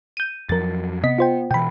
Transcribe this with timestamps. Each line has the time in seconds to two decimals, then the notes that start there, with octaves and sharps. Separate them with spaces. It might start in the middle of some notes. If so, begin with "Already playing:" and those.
0.17 G6 D#7
0.49 F2 F3 F#3 A#4 A6
1.03 C3 B3 D#5 B6
1.18 F4 C5 G5
1.51 B2 E3 G5 B5